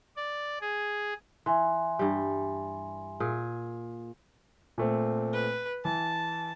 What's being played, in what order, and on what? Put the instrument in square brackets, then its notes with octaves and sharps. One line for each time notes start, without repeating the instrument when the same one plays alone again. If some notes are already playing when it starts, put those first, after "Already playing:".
[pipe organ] D5
G#4
[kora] E3 [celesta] E5 G#5 C6
[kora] G2 G3
A#2 G#4
[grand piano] A#2 A3 C4
[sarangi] B4
[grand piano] E3 [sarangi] A5